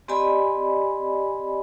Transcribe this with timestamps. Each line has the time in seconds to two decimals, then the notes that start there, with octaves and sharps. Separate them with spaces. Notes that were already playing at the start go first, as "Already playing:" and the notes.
0.08 C4 G4 D5 D#5 G#5 B5